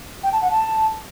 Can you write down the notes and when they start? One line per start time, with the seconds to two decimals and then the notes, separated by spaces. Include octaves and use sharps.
0.23 G5
0.33 A5
0.42 F#5
0.51 A5